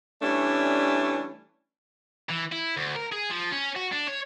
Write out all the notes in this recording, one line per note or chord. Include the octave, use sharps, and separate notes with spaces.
E3 G3 A3 C#4 D4
E3
E4
D2
A#4
G#4
F3
C#4
F#4
D4
C#5